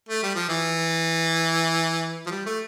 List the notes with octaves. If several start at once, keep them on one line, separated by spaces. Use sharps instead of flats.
A3
G3
F3
E3
F3
G3
A3